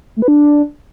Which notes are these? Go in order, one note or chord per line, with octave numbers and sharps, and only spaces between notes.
A3
B4
D4